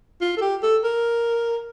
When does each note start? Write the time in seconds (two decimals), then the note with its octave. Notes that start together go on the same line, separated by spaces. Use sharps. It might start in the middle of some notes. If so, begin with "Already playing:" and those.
0.21 F4
0.37 A4
0.41 G4
0.63 A4
0.84 A#4